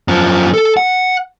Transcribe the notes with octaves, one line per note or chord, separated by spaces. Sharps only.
F#2 F3
A4
F#5